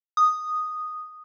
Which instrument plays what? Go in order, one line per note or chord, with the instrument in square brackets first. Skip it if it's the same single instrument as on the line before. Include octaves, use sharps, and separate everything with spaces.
[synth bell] D#6